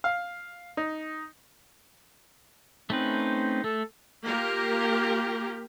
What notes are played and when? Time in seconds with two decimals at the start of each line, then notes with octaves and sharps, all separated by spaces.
0.04 F5
0.77 D#4
2.90 A3 C4 C#4 D#4 B4 C5
3.64 A3 A4
4.24 A#3 F4 G4 A#4